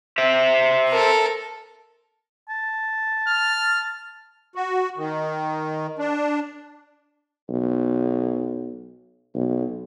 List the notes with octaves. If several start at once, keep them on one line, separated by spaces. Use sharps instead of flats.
C5 E5
A4 A#4
A5
F6
F#4
D#3
D4
B1
B1